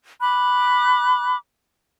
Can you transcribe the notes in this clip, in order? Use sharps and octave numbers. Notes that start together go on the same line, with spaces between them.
B5 D6 F#6